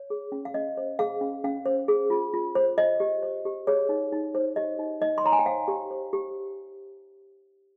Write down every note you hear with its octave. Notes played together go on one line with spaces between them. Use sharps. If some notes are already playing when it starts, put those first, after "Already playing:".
Already playing: C#5
G#4
C#4
F5
C#4 D#5
C5
G#4 F5
C#4
C#4 F5
C5
G#4
F4
F4
C5
C5 D#5
G4
C5
G4
G#4 C#5
D#4
D#4
C5
G4 D#5
D#4
D#4 D#5
C6
C#5 A#5
G#5
G5
C5 F5
G4
C5
G4